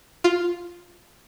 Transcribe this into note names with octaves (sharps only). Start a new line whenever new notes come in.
F4